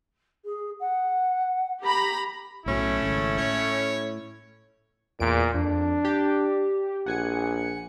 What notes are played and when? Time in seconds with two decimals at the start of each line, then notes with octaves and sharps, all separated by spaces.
0.45 G#4
0.80 F#5
1.82 G4 A#5 B5
2.66 B1 A2 F#3 A3 C#4 E4
3.03 G#1 C#3
3.38 A2 C#5
5.20 E2 A#2 D7
5.54 F2 D4
6.05 G4
7.06 A#1 F#5 G#5 C#7